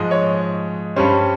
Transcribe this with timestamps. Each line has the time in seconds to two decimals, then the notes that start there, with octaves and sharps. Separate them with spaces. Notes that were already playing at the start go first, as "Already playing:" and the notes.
Already playing: G#2 F3 G#3 D#5
0.11 C#5
0.96 G2 G3 C#4 C5